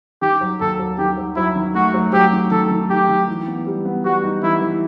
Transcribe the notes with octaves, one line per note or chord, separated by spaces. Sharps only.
D#3 G4
F#3
D#2 A4
F#3
D#3 G4
F#3
F#3 E4
D#3
A3 F#4
F#3
F#3 G4
D#3
D#3 A4
D#3
D#3 G4
D#3
E3
B3
G3
B3
G3 F#4
D#4
E3 E4
E3